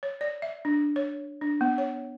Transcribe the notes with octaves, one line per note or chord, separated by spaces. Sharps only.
C#5
D5
E5
D4
C#5
D4
B3
C#5